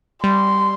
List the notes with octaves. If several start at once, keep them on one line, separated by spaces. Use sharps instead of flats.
G3 C6